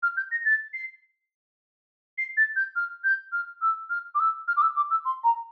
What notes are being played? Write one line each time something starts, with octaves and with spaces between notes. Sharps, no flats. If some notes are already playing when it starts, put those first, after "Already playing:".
F6
G6
A#6
A6
C7
C7
A6
G6
F6
G6
F6
E6
F6
D6
E6
F6
D6
E6
D6
E6
C6
A#5